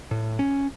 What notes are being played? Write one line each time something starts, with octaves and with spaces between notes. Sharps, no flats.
A2
C#4